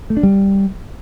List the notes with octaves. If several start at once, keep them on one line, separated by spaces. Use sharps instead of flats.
A3
D4
G3